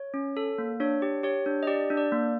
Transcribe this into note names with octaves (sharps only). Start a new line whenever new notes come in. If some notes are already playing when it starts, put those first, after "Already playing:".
Already playing: C#5
C#4
A4
A#3
D4 C#5
G4
G4 C#5
D4
D#5
G4 D5
D4
D5
A#3